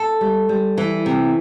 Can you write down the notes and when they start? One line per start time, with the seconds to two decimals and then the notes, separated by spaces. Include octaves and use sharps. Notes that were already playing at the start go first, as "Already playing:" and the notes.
Already playing: A4
0.21 G3
0.49 G3
0.78 E3
1.06 C3